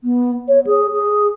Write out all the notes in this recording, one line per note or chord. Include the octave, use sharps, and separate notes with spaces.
B3
C#5
G#4
G#4